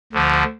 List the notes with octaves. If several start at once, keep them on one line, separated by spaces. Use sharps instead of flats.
D2 D3 F3